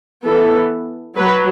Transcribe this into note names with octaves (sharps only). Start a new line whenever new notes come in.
E3 B3 A4
F#3 B4